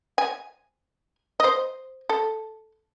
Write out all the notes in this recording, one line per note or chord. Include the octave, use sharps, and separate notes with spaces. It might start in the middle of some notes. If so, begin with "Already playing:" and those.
G#5
C5 D#5
A4